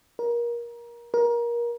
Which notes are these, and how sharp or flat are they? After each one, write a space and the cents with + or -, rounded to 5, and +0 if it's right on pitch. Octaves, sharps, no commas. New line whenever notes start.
A#4 +25
A#4 +25